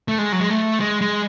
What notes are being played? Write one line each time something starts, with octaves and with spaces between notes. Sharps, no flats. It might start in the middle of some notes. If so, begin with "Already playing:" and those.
A3
G#3
F#3
G#3
A3
G#3
G#3